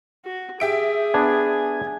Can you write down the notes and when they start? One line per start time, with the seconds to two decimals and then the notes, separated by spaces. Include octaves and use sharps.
0.25 F#4
0.60 G4 G#4 E5 D7
1.14 B3 D4 G#5